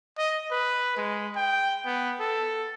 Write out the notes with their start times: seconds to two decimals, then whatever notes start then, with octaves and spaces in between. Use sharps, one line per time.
0.18 D#5
0.51 B4
0.97 G#3
1.36 G5
1.85 B3
2.20 A4